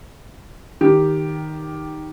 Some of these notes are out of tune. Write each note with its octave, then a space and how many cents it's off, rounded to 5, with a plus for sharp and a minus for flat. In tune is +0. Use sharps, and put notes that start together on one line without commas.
D#3 +0 G4 +0